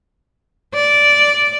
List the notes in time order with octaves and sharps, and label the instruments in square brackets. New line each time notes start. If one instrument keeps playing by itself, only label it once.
[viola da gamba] D5